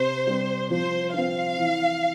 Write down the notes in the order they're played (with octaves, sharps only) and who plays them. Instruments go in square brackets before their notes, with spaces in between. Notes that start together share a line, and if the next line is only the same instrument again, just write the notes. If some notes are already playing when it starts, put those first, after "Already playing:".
Already playing: [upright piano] C3 [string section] C5
[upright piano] G3 C4
[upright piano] F3 [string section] C5
[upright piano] C4 F4 [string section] F5
[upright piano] E3